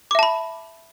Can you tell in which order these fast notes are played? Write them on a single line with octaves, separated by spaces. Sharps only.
D6 E5 A5 B5